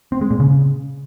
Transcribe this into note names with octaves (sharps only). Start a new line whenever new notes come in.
C4
G#3
A#2
C#3